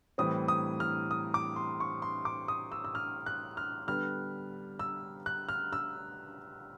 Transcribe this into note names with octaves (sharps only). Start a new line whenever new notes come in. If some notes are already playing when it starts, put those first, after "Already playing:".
A2 E3 G3 C4 D#6
D#6
F6
D#6
D6
C6
C#6
C6
D6
D#6
E6
E6
F6
F#6
F6
D3 G3 B3 F6
E6
F#6
F6
E6